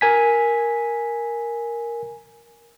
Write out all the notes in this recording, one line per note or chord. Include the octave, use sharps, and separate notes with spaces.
A#4 G#5 B6